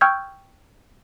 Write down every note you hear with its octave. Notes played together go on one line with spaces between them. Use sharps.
G5 C#6 E6 F6 G6 G#6